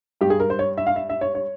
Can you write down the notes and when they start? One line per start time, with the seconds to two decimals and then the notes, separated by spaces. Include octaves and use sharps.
0.21 G2 G3 G4
0.30 G#4
0.40 A#4
0.50 C5
0.59 C#5
0.77 E5
0.87 F5
0.96 E5
1.09 E5
1.21 C#5
1.35 C#5